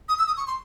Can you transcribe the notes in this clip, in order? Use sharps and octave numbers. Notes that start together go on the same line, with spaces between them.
D#6
E6
D#6
C#6
C6